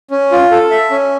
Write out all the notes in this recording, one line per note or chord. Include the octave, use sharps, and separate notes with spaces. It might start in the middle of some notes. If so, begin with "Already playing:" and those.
C#4
F4
A4
E5
C#4